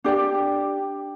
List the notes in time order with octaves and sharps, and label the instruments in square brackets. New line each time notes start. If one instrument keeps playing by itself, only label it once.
[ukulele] D4 G4 D5 G5